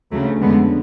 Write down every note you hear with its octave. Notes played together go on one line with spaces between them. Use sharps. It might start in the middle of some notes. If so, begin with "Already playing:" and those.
D2 C#3 F#3 A3
F2 D3 G#3 B3